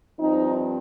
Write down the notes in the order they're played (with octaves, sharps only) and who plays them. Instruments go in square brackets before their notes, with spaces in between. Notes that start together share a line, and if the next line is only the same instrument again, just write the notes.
[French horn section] G2 F3 C4 D#4